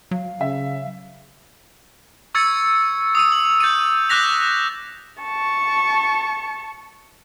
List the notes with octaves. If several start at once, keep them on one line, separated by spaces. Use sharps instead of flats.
F#3 F5
C#3 E5
C#6 E6 G#6 A6 C#7 D#7
D#6 E6 D#7
F#7
G6 A6 C#7 D#7
D6 F#6 G6 A#6 B6 F7
A5 C#6